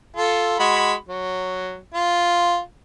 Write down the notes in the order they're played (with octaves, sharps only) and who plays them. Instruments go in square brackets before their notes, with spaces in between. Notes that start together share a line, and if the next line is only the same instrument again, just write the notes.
[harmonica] F4 A4
G#3 F#4 B5
F#3
F4